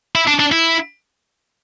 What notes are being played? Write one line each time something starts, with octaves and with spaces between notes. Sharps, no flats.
E4
D4
D4
E4